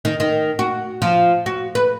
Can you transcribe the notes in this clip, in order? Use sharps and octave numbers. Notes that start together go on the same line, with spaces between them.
D#3
D#3
F#4
F3
F#4
B4